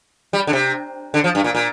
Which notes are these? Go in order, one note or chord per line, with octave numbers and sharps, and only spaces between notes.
G3
D3
C3
D3
F3
G2
A#2
A#2